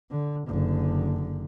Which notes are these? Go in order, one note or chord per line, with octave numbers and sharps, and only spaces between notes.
D3
F#1 D3